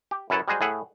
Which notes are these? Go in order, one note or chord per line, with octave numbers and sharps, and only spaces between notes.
G4
F#2 E4 A4 B4 C#5 A5
G3 G#3 F#4 G#4 C5
A2 A3 G#4 E5 F#5